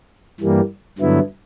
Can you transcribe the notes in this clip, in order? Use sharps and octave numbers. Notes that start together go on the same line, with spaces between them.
G2 E3 G3 A#3
G2 D3 F#3 B3 E4